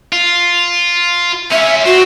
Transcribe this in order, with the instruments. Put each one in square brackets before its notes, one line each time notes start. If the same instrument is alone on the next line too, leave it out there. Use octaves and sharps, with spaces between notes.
[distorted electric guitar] F4
[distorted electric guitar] C#4 F4 [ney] E5
[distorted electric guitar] C4 [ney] F#4